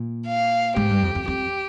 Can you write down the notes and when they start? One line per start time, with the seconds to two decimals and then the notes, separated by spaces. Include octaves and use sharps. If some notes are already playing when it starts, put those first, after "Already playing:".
Already playing: A#2
0.27 F5
0.76 G#2 G4
0.90 G2
1.03 F2
1.15 F2
1.28 F2 G4